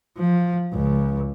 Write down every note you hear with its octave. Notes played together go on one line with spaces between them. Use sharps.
F3
C#2